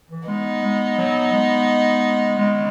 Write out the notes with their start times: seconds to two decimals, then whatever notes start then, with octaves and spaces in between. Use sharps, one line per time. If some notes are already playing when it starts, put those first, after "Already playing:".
0.10 E3
0.27 G#3 B3 D#4
0.63 G#3
0.98 F#3
1.32 G#3
2.38 G#3